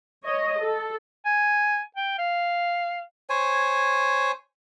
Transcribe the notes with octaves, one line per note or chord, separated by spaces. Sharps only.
C#5 D#5
A4
G#5
G5
F5
C5 C#5 G#5